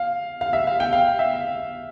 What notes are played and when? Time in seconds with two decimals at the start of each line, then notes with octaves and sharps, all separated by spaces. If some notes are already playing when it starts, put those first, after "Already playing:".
Already playing: F5
0.41 F5
0.53 E5
0.67 F5
0.80 G5
0.93 F5
1.19 E5